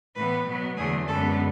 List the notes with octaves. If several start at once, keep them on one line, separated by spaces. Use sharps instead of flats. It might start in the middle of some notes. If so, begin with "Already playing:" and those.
A2 E3 B3 B4
B2 F#3 B3
E2 D3 F#3 A3 G#4
F#2 D3 G#3 B3 A4